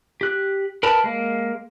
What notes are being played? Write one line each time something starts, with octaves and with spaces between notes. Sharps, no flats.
G4 F#6
A#4 B4 A5 B5
G#3 A#3